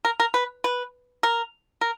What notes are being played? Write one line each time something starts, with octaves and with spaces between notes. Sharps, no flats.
A#4
A#4
B4
B4
A#4
A#4